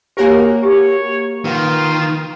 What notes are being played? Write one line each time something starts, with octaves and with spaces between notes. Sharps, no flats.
A#3 F#4 G4 A#4 C#5 G#5
G4 C#5
D#3 F4 B4 F#5